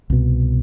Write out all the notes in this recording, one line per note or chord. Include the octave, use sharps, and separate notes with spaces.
C2 B2